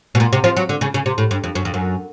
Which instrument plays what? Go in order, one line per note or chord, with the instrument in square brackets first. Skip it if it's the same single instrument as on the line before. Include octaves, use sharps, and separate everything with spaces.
[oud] B2
A#2
C3
F3
F#3
D3
C#3
C#3
C3
A2
G2
F2
F#2
F2
F#2